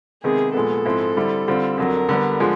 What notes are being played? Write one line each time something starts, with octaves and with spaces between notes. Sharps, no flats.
C3 D#3 G#3 B3 G#4
A#2 F3 G#3 B3 A4
G#2 F3 G#3 C4 E4
D3 G3 C4 E4
D3 G3 C4 F4
F2 D3 F#3 A#4
D3 G3 B3
D3 F3 G#3